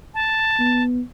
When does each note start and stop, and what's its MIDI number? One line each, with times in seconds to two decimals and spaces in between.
0.14 0.83 81
0.59 1.00 59